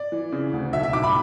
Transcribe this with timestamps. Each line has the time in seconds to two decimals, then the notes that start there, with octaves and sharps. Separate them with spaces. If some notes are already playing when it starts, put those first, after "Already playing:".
Already playing: D5
0.12 E3
0.32 C#3
0.53 D2
0.73 B1 E5
0.83 E5
0.93 B1 D6
1.03 B5